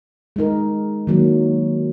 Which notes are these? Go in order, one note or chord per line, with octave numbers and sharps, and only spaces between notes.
G#3 D#4 A#4
D#3 F#3 A#3